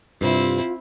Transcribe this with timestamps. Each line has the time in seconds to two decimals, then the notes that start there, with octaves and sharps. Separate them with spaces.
0.21 G2 C3 C4 E4 F4